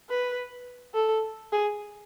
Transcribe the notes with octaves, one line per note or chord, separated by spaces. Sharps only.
B4
A4
G#4